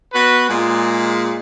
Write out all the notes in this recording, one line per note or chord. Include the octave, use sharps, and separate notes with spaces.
B3 F#4 B4
A#2 G#3